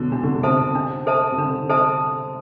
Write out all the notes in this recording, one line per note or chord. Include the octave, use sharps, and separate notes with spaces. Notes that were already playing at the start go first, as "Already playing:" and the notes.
Already playing: B2 D3 F#3
C3 D4
D3
C3
A4 C5 E5 A5
D4
A4 C5 E5 A5
C3
D3 D4
A4 C5 E5 A5